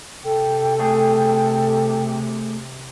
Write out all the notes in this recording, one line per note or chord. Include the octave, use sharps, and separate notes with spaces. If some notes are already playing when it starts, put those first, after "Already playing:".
C3 A4 G5
A3 G#4